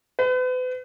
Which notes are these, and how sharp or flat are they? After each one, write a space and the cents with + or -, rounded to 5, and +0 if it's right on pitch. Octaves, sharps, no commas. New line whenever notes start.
B4 +40